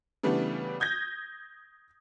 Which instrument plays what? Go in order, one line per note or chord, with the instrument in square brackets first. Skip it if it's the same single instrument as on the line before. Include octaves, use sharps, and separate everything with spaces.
[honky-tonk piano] C#3 E3 G3 A3 B3 D4
D#6 G6 G#6 A#6